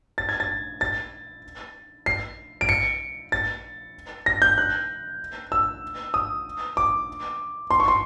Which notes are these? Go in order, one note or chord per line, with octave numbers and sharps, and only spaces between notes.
A6
G#6
A6
A6
C7
D7
C#7
A6
A#6
G6
F#6
E6
D#6
D6
C6
C#6
C6